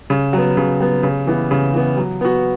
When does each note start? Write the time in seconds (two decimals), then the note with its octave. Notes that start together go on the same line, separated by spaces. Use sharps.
0.10 C#3
0.33 F#3 B3
0.57 C#3
0.80 F#3 B3
1.03 C#3
1.27 E3 B3
1.51 C#3
1.74 E3 B3
1.97 F#3
2.21 B3 F#4